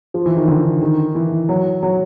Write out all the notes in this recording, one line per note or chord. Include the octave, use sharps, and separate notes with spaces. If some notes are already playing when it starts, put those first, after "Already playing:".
F3
E3
D#3
D3
D#3
E3
F#3
F#3